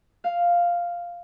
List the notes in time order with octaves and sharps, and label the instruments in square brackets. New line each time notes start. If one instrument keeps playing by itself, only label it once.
[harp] F5